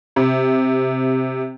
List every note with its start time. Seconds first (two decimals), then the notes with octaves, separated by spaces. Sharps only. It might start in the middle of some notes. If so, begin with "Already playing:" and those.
0.16 C3